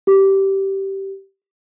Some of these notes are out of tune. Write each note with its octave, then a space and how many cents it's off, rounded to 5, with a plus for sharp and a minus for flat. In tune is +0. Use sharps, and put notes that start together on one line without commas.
G4 -15